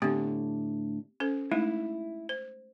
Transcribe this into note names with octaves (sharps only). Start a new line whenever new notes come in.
A2 D3 B3 C4 G4
C#4 A4 C5
G#3 A3 D#4 E4
C5